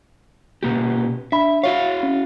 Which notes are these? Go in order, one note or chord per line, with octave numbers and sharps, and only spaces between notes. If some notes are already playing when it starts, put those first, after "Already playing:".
B2 A#3 G4
D4 E5 B5
E4 F#4 C#5 F5
C#4